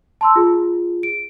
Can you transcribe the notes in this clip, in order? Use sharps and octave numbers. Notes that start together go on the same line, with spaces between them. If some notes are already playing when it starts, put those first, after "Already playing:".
A5 C6 E6
F4 G#4
D7